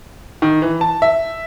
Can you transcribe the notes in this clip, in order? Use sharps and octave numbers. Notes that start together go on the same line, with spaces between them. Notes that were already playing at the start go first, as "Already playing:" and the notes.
D#3
E3
A5
E5